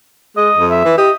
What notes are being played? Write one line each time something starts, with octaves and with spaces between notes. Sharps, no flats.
G#3 D#5
F2
E5
E3
G4 D#5